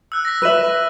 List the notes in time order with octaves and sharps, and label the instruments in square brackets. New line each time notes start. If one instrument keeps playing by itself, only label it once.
[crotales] E6 F#6
A#6 B6
[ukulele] B4 E5 [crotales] A#6 D#7 F#7